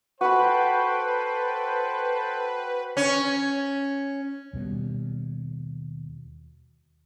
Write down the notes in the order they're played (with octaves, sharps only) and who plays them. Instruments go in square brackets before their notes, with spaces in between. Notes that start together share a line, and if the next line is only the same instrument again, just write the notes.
[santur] F#4 B5 [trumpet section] A4 C5 G5 [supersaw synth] B4
[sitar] C#4
[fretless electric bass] D#2 B2 G3